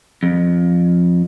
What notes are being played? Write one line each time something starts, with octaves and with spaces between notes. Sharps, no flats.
F2